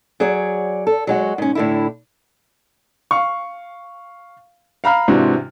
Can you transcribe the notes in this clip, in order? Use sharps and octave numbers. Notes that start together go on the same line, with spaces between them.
F#3 G#4 C#5 D5
A4
F#3 G#3 F#4
G#2 C#4
A2 D3 E4
F5 C#6
F5 A#5 B5 F6
G#2 C3 E3 D4 F#4